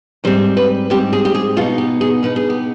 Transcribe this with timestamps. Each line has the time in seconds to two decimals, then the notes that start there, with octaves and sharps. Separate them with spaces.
0.24 G#2 G3 C4 C5
0.57 B4
0.90 G#2 G3 C4 G4
1.13 G#4
1.25 G4
1.35 G#4
1.57 B2 B3 D#4 F4
1.78 G4
2.01 G#4
2.23 B2 B3 D#4 B4
2.36 G#4
2.50 G4